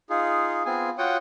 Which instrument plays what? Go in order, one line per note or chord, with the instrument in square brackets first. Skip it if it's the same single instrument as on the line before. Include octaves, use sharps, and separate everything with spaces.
[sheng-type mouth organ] D#4 F4 G#4
B3 C4 F4 G#4 G#5
F4 F#4 C#5 F#5 G5 D#6